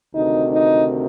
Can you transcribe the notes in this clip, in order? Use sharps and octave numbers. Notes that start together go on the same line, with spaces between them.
D2 C3 D#3 D#4
D#4